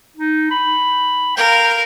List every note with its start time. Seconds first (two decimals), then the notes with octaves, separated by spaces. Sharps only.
0.17 D#4
0.51 B5
1.37 A#4 F5 G5